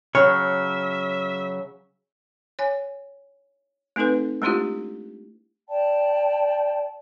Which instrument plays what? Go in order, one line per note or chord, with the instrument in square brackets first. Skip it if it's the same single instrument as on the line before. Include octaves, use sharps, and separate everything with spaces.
[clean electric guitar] C#3 F#3 [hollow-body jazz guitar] C#5 [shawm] E5 [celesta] F6
[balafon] C#5 G#5
A3 C4 D#4 A4 B4
G#3 A3 D4 E4 F4 G4
[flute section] D5 G5 A5